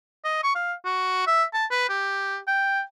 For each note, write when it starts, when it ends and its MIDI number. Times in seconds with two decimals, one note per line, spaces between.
0.24 0.41 75
0.43 0.52 85
0.55 0.73 77
0.85 1.26 66
1.27 1.44 76
1.54 1.66 81
1.71 1.89 71
1.89 2.38 67
2.47 2.81 79